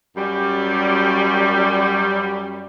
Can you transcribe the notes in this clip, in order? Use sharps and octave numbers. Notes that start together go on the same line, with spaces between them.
F#2 G3